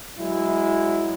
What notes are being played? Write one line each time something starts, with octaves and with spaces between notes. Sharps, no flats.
F#3 G#3 E4